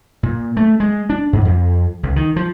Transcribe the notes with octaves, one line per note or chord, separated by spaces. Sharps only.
A#2
A3
G#3
D4
G#2
F2
C#2
D#3
F3